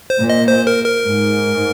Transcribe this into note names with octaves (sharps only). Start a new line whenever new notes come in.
C5
A#2
D#5
C5
A#4
A#4
G#2